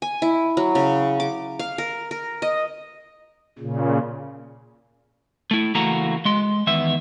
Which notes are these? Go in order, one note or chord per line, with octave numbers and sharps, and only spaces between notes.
G#5
E4
F#3
C#3
D6
F5
A#4
A#4
D#5
A#2 C#3
A3 E4
C#2 E3 A3 A#3 F#4 A#5
G#3 C6
E2 D#3 B3 E5